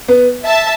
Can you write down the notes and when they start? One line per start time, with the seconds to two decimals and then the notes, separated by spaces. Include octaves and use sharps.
0.08 B3
0.44 E5 A5